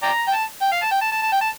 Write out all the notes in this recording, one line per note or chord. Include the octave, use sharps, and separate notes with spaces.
D5 G5 A#5
G5
A5
G5
F5
A5
G5
A5
A5
A5
G5
A5